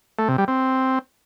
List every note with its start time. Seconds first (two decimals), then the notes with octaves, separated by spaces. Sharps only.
0.19 A3
0.28 C3
0.38 G3
0.48 C4